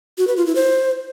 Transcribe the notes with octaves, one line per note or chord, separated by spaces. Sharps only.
F#4
B4
F4
E4
C5